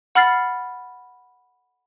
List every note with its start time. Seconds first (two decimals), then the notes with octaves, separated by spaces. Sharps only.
0.15 F#5 B5 F6 A6 C7